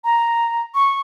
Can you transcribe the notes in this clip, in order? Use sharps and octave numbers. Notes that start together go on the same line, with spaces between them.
A#5
C#6